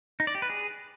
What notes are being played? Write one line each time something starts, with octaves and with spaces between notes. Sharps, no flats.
D#4
D5
G4
B4
G#4